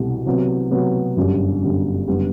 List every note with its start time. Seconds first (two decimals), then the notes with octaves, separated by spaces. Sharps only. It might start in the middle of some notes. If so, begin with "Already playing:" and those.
Already playing: C2 B2 A3 E4 G4
0.26 C3 F#3 B3 F#4
0.71 C3 F#3 B3 F#4
1.17 G1 F#2 D3 G3
1.62 G1 F#2 D3 G3
2.07 F#1 D3 G3 B3